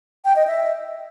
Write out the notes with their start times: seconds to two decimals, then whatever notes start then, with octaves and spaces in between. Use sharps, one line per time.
0.25 G5
0.36 D#5
0.47 E5